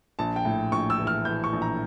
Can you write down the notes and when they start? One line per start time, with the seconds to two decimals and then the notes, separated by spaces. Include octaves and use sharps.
0.19 A#1 A5
0.36 G5
0.45 A2
0.72 A#1 C#6
0.90 E6
0.99 E3
1.07 F6
1.25 E3 G6
1.44 C#6
1.53 A#1
1.62 A#5